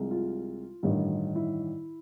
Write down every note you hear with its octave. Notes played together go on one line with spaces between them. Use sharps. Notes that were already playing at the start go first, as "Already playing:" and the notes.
Already playing: C2 C3 F3 G#3
F4
A1 G2 D#3 G3
E4